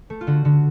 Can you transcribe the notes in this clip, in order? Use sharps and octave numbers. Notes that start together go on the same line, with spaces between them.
A3
F4
D3 F#4
D3